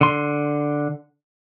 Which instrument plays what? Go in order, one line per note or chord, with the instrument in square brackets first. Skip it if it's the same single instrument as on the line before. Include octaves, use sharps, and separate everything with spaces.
[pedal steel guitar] D3 C6